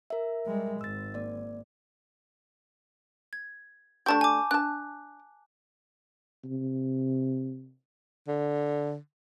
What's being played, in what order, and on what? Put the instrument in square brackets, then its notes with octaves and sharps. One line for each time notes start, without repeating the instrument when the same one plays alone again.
[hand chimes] A#4 E5
[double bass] G3 G#3
[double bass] G#1 [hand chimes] E6 A6
[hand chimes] A#3 D5
[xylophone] G#6
[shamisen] A3 D4 G4 [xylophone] A5 C#6 G6
[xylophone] G#5 D6
[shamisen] D4 A5 [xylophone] F#6
[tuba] C3
[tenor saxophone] D3